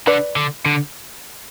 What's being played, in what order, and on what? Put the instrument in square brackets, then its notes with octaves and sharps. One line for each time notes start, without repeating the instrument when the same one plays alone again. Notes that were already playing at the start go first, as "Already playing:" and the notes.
[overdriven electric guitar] D3 [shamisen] B4 D5
[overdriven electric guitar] D3
D3